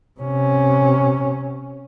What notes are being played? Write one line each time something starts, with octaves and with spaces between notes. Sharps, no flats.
C3 C#4